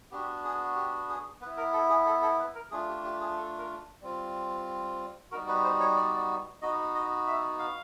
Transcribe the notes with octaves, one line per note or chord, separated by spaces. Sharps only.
B3 D4 F#4 G4
G#4
G4
G#4
B3 B4
E4
A#4
A4
G#4
A4
A4
B4
A#4
A3 D4 F4 G#4
G4
G4
G#4
A4
A#4
G3 C4 F4
G3 B3 D#4 F#4 A#4
B4
C5
C#5
D5
B3 D#4 F#4 D#5
D#5
E5
F5